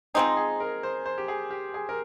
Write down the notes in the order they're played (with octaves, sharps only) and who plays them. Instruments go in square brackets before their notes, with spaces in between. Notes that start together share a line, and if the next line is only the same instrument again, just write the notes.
[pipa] F3 G#3 C4 D#4 [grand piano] G#4
[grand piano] G#4
A#4
C5
C5
G4
G#4
G4
G#4
A#4